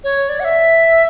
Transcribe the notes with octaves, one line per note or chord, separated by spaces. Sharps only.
C#5
D5
F#5
E5